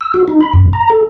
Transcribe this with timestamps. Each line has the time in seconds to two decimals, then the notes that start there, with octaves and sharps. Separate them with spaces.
0.01 E6
0.14 F#4
0.28 D#4
0.41 B5
0.53 F#2
0.73 A#5
0.90 A4